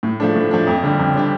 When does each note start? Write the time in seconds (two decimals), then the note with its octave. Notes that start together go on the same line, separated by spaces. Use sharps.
0.03 A2
0.20 F3 A3 D4
0.35 A2
0.51 F3 A3 D4
0.67 F2
0.83 D3 G3 D4 G4
0.99 F2
1.14 D3 G3 D4 G4